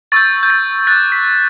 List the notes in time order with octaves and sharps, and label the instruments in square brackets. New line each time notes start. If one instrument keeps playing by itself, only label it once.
[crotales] C#6 E6 G6 A6
G6
A6
D6 F#6 A6
B6